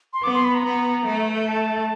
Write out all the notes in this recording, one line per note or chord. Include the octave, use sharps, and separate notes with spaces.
C6
B3 D6
C6
B5
A#5
B3
A3
A5